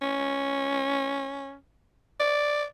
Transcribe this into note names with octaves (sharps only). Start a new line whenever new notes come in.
C#4
D5